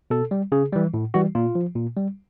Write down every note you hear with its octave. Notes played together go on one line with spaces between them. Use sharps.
B2 A4
G3
C#3 G#4
E3 G3
A2
E3 G3 F#4
A#2 F4
F3
A#2
G3